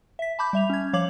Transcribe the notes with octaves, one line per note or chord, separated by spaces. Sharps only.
E5 B6
A5 B5 D6 G6
G3 E5 F7
C#4 G#6
F3 C#5 F5 D6 G#6 F#7